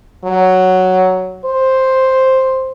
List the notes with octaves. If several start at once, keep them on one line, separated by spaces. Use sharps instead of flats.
F#3
C5